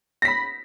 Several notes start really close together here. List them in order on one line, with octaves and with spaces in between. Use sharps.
A#6 B6 B5